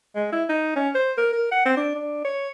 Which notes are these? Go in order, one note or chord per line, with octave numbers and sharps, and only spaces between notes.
G#3
E4
D#4
C#4
C5
A#4
A#4
F#5
C4
D4
D4
C#5